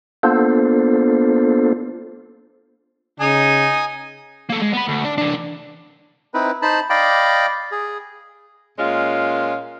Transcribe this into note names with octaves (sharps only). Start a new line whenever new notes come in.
A#3 B3 D4 F4 A4 C5
C#3 D#4 G#5 D#6
A#3 A4
G#3
B3 B5
D2
D4
E3 D4
C4 D#4 E4 B4
D#4 C5 A5 B5
D5 D#5 F5 G5 B5 D6
G#4
A#2 G#3 C#4 F4